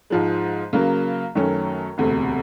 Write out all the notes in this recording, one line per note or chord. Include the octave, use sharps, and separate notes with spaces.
G#2 F3 G#3
C#3 F#3 A#3
F#2 D#3 F#3 A3 C#4
E1 D2 C3